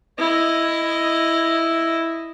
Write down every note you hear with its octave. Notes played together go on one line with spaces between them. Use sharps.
E4 D#5